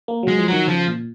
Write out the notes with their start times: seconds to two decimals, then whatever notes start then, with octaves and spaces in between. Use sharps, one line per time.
0.08 A#3
0.23 F#3 G#3
0.38 F3
0.48 D#3 F#3
0.68 C#3 F3
0.88 A#2